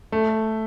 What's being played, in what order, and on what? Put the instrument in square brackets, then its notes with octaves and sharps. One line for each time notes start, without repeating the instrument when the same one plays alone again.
[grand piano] A3